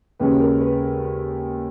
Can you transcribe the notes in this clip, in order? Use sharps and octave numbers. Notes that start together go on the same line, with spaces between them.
D#2 C#3 G#3 C#4 B4
A#4
B4